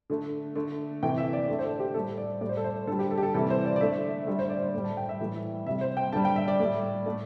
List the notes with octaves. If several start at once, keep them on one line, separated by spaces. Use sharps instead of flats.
D3 A3
D3 A3
C3 E3 A3 G5
E5
D5
D3 A3
C5
A4
G4
A2 G3 A4
D5
A2 G3 D5
C5
A4
C5
D3 G3 A4
G4
A4
G4
A4
C3 E3 G3 A4
C5
D5
D5
D3 A3 E5
D3 G3 E5
C5
D5
C5
A2 G3
A5
G5
E5
A2 E3 G3
C3 G3 E5
C5
G5
D3 G3 A5
G5
E5
D5
A2 G3
A2 A3